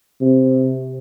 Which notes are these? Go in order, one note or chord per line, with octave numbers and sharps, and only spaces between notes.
C3